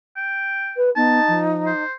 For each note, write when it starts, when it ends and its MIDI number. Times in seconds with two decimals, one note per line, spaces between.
0.16 0.78 79
0.76 0.90 71
0.96 1.20 59
0.96 1.83 63
0.96 1.38 81
1.28 1.73 53
1.66 1.93 72